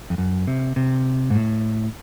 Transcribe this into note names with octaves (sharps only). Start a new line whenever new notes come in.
F2
F#2
C3
C3
G#2
A2